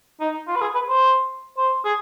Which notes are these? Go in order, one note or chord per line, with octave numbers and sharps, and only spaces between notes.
D#4
F4
B4
G#4
B4
C5
C5
G#4